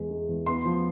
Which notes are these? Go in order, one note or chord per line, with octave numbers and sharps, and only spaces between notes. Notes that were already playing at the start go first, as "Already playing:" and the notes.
Already playing: E2 G#3
G#3
E2
B3 C6
F3